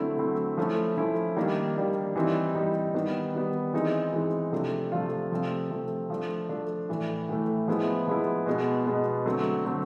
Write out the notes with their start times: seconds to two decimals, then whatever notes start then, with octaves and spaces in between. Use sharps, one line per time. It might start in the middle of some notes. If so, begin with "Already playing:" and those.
Already playing: D3 F#3 A3 C4 E4
0.18 D3 F#3 A3 C4 E4
0.57 F3 A3 C#4 E4
0.97 F3 A3 C#4 E4
1.36 D#3 G3 A#3 D4
1.75 D#3 G3 A#3 D4
2.16 E3 G3 C4 D#4
2.55 E3 G3 C4 D#4
2.94 D#3 G3 B3
3.34 D#3 G3 B3
3.73 E3 G#3 C4 D#4
4.13 E3 G#3 C4 D#4
4.52 C3 F3 A3 D4 F4
4.92 C3 F3 A3 D4 F4
5.31 C3 F3 A3 C4
5.70 C3 F3 A3 C4
6.10 F3 A3 D4 F4
6.49 F3 A3 D4 F4
6.89 A2 E3 A3
7.29 A2 E3 A3
7.68 F3 G#3 B3 E4
8.07 F3 G#3 B3 E4
8.46 B2 G#3 B3
8.87 B2 G#3 B3
9.26 D3 F#3 A3 C4
9.65 D3 F#3 A3 C4